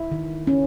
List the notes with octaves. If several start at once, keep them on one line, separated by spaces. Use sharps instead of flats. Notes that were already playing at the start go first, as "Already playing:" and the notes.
Already playing: E4
D#3
C#4